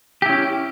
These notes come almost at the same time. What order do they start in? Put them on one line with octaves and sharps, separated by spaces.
G4 E4 C#4